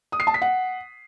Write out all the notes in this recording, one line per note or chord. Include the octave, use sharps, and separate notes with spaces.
D#6
C7
A5
B6
F#5